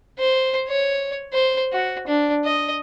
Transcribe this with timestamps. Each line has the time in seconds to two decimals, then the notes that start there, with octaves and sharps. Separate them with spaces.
0.19 C5
0.68 C#5
1.33 C5
1.73 F#4
2.07 D4
2.45 D#5